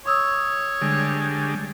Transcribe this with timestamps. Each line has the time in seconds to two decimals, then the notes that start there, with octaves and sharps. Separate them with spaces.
0.06 C#5 C#6 D#6 E6
0.81 D3 G3 G#3